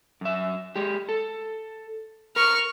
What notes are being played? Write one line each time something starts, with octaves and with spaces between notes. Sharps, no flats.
F#2 E5
G#3 G4
A4
A#4 C#6 F6